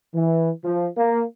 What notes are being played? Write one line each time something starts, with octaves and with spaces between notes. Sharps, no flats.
E3
F3
A#3